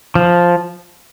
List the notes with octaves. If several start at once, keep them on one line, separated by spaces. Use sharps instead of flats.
F3